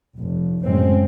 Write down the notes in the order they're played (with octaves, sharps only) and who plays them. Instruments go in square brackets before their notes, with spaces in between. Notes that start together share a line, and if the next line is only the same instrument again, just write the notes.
[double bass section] F1
F#2 A2 C#3 G#3 C4